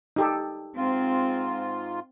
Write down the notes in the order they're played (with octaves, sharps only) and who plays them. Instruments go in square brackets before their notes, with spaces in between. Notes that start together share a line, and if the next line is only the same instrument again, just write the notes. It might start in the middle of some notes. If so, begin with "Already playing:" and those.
[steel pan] D#4 G4 A4
[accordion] G#2 F4 [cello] C4